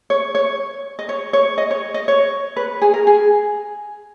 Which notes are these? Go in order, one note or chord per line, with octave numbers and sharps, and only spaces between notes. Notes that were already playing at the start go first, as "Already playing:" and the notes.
C#5
C#5
D#5
C#5
C#5
D#5
C#5
D#5
C#5
B4
G#4
A#4
G#4